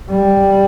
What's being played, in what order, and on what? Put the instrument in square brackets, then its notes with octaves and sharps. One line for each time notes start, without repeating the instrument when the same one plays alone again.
[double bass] G3